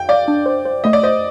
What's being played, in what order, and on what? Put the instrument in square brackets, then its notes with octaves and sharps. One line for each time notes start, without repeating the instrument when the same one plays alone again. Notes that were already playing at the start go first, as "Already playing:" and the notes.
Already playing: [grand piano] G5
[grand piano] D5 [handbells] F5
[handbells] D4
C5
C5
[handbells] A3 [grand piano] D#5
[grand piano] D5
[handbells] C5 [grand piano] D#5